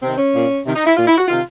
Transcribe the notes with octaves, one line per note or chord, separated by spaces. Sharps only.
C3 D#3 C4
C#4
A#2
C3 D#3
D#4
E4
A#2 F4
E4
F#4
C3 D#3 F4